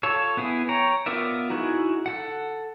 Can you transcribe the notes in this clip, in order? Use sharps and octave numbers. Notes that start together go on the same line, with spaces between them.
F4 A4 C#5
B3 E4 G#4
C#5 G5 A#5
B3 F4 A#4 D5 E5
D#4 E4 F#4 G#4
A4 F#5